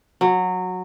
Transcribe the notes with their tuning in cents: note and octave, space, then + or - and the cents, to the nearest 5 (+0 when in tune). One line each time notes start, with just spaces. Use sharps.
F#3 -15